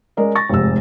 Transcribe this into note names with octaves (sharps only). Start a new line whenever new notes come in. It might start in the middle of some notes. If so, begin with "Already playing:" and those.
G#3 C#4 A#4 D5 D#5
C#6 A6 A#6
F1 G#2 C3 G#3 E6